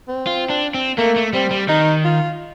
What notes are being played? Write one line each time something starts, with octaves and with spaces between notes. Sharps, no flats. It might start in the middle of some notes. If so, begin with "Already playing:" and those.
C4
F4
D4
C4
A3 A#3
A3
G3 C4
G3
D#3 D#4
F4